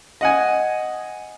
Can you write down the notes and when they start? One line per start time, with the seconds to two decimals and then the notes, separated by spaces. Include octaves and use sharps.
0.21 D#5 F#5 G#5